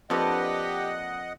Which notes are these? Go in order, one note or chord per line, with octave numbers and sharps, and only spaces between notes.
F2 A#3 D4 G4 B4 D#5 F#5